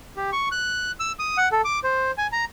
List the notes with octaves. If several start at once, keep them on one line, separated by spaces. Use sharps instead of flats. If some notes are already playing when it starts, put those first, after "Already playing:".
G4
C#6
F#6
E6
D#6
F#5
A4
D6
C5
G#5
A#5